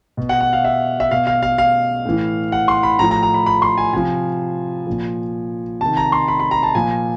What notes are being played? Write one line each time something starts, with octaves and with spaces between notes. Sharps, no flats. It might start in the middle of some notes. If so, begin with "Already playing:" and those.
B2
F#5
F#5
F5
E5
E5
B2 F5
F5
F5
F5
A2 E3
F#5
C6
B5
A2 F3 A#5
A#5
A#5
B5
B5
C6
G#5
C3 F3 G#5
A#2 F3
C3 D#3 A5
A#5
C6
B5
B5
A#5
A5
A#2 F3 G#5